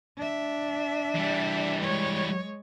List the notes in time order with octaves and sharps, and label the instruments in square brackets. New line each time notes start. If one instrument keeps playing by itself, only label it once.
[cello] D4 E5
[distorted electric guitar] E3 G3
[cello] G#3 C#5